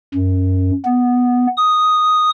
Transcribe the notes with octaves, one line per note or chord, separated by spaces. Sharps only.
F#2
B3
D#6